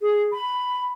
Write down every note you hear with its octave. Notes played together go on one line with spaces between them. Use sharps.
G#4
B5